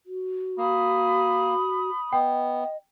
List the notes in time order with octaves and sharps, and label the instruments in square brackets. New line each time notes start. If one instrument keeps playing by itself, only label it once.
[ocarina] F#4
[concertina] A#3 [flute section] B5 D#6
[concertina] B3 [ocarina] D#5 [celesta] G5